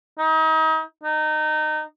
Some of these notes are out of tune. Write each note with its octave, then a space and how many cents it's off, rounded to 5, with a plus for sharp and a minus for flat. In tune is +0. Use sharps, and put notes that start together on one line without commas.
D#4 +35
D#4 -20